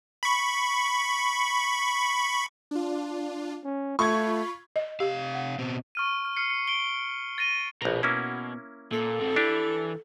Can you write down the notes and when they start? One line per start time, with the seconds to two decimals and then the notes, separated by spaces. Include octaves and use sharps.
0.23 B5 C#6
2.71 D4 F4
3.64 C#4
3.99 A3 F4 B5 C#6 G#6
4.76 D#5
5.00 C3 G4 F5
5.35 F#5
5.59 B2 C4
5.95 C#6 F6 D#7
6.25 F6
6.36 F6 C7 C#7
6.50 C#7
6.67 D7 G7
7.38 A6 A#6 D#7 G7
7.82 A#1 B2 A#5
8.03 A#3 C#4 E4
8.92 A#2 A4
9.19 G#2 C4
9.36 E3 D4 G4